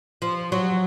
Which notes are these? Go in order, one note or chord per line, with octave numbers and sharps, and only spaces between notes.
F3
F#3